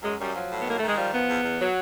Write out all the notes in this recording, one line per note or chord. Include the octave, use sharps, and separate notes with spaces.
F#2 G#3
F#2 G3
F3 F#3
A2
B3
D#3 A#3
D#3 A3
G#3
F3 G3
F3 B3
E2
E2
F#3